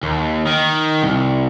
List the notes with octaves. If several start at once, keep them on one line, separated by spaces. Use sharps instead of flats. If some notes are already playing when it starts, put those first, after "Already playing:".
D#2
D#3
C2